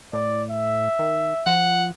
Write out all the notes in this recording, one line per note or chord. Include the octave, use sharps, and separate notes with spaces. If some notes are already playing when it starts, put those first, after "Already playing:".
A2 D5
E5
D#3
F3 F#5